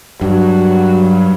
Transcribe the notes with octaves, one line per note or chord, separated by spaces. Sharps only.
G2 F#3 F#4